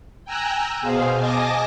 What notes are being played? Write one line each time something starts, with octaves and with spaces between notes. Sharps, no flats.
G5 G#5 A#5 E6 F#6
B2 G#4 C5 F5
D#5 G#5 A5 D6 A#6